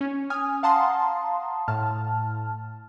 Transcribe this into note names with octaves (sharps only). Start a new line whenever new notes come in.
C#4
G#5 D#6 F6
F5 F#5 A5 A#5 C6 D#6
A2 A5 F6